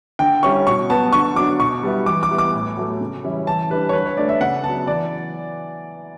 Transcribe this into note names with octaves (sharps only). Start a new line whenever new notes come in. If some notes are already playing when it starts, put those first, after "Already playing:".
D3 G5
G3 C#4 E4 C#6
B2 C#6
F#3 B3 A5
D3 C#6
F#3 B3 D4 D6
B2 C#6
G3 B3 E4
E3 D6
D6
G3 B3 E4
D6
A2
F#3 A3
C#3
E3 G3 C#4 E4
E3 A5
G3 D4 B4
C#5
D3 B4
C#5
A3 D4 D5
E5
C#3 F#5
F#3 B3 A5
E3 D5